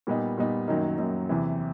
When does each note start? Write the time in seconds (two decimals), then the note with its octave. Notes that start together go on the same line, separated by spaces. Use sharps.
0.07 A#2 G3 B3 D#4
0.38 A#2 G3 B3 D#4
0.68 F#2 D#3 F#3 A#3 D#4
0.98 F#2 D#3 F#3 A#3 D#4
1.29 E2 C3 E3